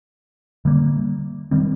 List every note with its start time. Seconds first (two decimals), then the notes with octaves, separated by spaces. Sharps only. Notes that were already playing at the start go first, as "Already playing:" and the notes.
0.65 D3 G3 A#3
1.51 D#3 G3 C4